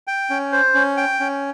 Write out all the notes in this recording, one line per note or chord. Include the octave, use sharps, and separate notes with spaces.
G5
C#4
C5
C#4
G5
C#4